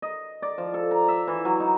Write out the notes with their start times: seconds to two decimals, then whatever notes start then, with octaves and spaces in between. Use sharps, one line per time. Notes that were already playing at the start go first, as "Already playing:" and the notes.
0.02 D#5
0.42 D5
0.58 F3
0.74 A4
0.91 A#5
1.08 E5
1.27 E3
1.45 F#3
1.60 D#4